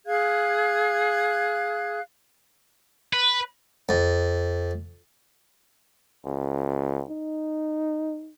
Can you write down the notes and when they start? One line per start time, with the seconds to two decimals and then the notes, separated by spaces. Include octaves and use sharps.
0.07 G#4 F5 F#6 G#6
3.13 B4
3.89 F2
6.25 C#2
7.09 D#4